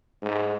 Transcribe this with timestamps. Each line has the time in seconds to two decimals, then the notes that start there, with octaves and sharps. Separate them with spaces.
0.22 G#2